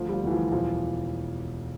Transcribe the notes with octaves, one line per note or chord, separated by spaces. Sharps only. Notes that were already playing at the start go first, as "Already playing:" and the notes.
Already playing: D2 F3
G3
F3
D2 E3
F3
E1 F3